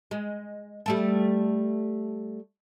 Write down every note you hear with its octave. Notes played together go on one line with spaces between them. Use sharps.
G#3
G3 A3 A4